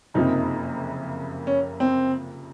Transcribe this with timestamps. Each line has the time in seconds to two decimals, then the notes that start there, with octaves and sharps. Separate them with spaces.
0.14 F#1 F2 C3 F3 A#3 D#4
1.47 C#4
1.80 C4